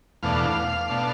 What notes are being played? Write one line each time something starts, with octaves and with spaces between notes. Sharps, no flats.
E2 B2 A3 D4 F5
B2 A3 D4